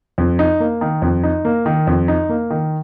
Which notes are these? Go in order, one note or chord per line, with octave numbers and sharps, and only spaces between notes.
F2
D#4
A#3
D#3
F2
D#4
A#3
D#3
F2
D#4
A#3
D#3